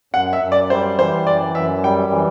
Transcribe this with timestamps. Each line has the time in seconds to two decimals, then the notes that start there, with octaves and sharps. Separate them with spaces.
0.14 F#2 F#5
0.33 E5
0.42 F#2
0.52 D5
0.70 G3 C5
0.99 E3 C5
1.27 F#2 D5
1.55 F#2 E5
1.83 G3 G5
2.12 E3